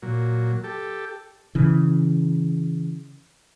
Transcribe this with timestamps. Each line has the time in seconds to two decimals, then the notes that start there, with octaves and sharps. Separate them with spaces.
0.02 A#2 F#3
0.64 G4 A4
1.55 C#3 E3